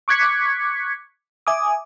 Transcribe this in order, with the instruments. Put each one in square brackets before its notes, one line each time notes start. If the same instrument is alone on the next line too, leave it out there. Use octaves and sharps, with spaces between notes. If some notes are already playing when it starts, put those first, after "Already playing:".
[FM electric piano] C#6 D6 F#6 G#6 B6 C#7
E5 G#5 D6 D#6